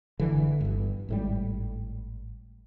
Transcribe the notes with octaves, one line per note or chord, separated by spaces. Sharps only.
F#1 D3 E3
G1 G2
G#1 A2 G3